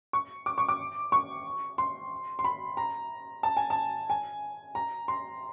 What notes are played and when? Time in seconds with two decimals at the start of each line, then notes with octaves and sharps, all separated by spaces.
0.13 C#6
0.46 D6
0.58 C#6
0.68 D6
1.12 C#6
1.78 C6
2.39 C6
2.44 B5
2.77 A#5
3.43 A5
3.57 G#5
3.70 A5
4.10 G#5
4.75 A#5
5.08 C6